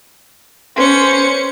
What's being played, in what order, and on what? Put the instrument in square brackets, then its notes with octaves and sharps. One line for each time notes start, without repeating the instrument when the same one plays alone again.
[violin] C#4 C#7 [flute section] B4 C5 C6